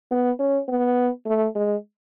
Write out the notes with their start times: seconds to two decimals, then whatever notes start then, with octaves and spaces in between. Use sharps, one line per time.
0.11 B3
0.40 C#4
0.69 B3
1.26 A3
1.55 G#3